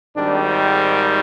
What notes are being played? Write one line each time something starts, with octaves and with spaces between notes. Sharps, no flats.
G#1 G#2 D#3 G3 D4